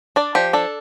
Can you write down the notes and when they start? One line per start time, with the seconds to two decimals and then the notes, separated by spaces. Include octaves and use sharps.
0.16 D4 D5
0.35 F3 G4
0.53 D4 A4